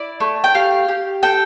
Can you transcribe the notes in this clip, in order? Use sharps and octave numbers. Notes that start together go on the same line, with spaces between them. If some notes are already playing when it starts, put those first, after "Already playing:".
Already playing: E4 D5
A3
G5
G4 F5
G4
A4 G5